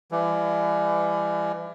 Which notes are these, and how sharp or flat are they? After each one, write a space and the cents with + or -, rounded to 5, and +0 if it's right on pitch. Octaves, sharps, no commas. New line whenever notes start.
E3 +35 G3 +40